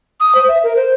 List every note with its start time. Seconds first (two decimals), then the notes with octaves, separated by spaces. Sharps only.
0.20 D#6
0.35 C5
0.48 E5
0.63 A#4
0.76 C5